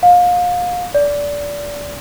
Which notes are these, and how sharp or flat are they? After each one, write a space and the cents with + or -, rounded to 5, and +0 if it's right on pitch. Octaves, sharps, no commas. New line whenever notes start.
F5 +30
D5 -20